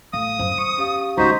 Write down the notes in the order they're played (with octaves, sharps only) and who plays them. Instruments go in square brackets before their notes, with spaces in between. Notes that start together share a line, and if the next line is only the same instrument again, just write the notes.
[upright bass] A1 [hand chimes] F5 [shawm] D#6
[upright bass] F#2 [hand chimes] C5
[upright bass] E2 [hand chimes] C#6 C#7
[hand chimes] C#4 G4 F5
[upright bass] C#2 D#3 [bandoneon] D#4 F#4 C5 [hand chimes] A#5 C6 B6